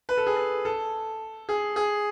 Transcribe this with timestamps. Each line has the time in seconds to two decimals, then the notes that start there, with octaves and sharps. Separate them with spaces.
0.09 B4
0.17 A4
0.27 G#4
0.36 A4
0.65 A4
1.49 G#4
1.76 G#4